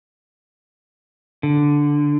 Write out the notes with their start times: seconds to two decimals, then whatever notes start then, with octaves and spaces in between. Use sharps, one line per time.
1.43 D3